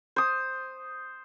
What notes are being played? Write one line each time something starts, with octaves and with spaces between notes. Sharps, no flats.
C5 D#6